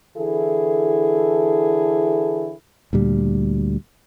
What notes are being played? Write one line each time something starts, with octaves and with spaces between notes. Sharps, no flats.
D3 E3 E4 G#4 A4
D2 A#2 G3